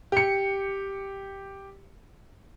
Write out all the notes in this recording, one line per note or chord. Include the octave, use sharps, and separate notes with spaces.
G4 C#7